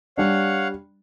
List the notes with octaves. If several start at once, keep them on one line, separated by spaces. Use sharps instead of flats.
G3 D4 C#5 F5 F#5